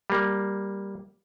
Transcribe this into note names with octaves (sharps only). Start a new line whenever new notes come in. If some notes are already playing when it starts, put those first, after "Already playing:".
G3 A#3